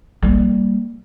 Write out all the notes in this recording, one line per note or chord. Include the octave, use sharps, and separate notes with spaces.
G3 A#3